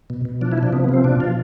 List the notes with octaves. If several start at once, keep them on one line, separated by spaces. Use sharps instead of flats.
B2
B2
F3 D4
E4
F3
D4
C3 B3
B3
F3 C4
B2 D4
B2 F4